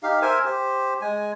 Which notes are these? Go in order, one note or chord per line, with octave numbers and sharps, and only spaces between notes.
D#4 G4 F5
A#4 C5 E5 G#5
G4 C5
G#3 G#5